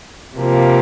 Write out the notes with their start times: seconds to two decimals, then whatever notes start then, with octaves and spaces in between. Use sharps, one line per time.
0.36 C3 F3 A#3